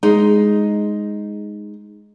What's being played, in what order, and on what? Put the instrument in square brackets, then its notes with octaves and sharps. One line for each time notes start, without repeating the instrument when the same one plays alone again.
[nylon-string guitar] G#3 D#4